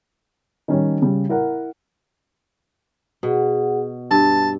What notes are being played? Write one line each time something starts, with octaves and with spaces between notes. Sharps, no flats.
D#3 G3 C#4
C#3 G3
E4 A#4 F#5
B2 F#4 G#4 F#5
G2 G4 A5